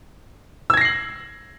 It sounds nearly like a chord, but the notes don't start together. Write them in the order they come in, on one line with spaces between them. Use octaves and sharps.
E6 G#6 A#6 C7 F#7